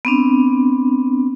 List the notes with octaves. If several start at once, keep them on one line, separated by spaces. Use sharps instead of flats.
B3 C4 D4